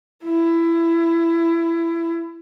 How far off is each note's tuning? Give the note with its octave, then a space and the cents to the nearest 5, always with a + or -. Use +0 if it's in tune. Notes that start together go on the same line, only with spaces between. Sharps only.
E4 +20